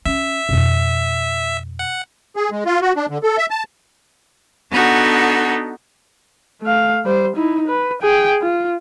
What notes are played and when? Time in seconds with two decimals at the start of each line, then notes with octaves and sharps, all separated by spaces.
0.06 C#4 E5
0.49 F2 B2
1.79 F#5
2.36 G#4
2.51 G#3
2.66 F4
2.82 F#4
2.96 D4
3.10 D3
3.23 A4
3.38 E5
3.50 A5
4.70 B3 D4 D#4 F#4 A4
6.62 A3 F5
7.05 G3 C5
7.37 D#4 E4
7.68 B4
8.02 G#4 G5
8.42 F4